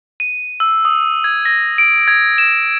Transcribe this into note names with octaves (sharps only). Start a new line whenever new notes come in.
D#7
E6
D#6
G#6
A#6
D7
G#6
E7